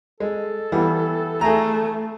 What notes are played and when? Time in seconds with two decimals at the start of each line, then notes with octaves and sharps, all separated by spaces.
0.20 G#3 A4
0.72 E3 G3 B3
1.41 A3 G#4 A#5